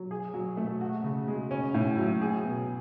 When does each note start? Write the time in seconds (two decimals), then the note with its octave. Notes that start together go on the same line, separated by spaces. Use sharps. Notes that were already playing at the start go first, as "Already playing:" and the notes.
Already playing: F#3
0.11 G#4
0.34 F#3
0.57 A3
0.81 F#4
1.04 C#3
1.28 G#3
1.51 C#4
1.74 A2
1.97 F#3
2.21 G#4
2.44 B2